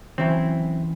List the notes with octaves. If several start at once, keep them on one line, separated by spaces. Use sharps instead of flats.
E3 F#3 C4 C#4 E4 A#5